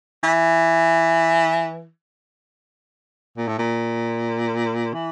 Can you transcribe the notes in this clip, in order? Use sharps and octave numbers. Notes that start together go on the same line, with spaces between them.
E3
A#2
A2
A#2
E3